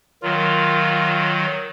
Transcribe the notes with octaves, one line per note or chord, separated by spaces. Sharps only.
D#3 F#3 F4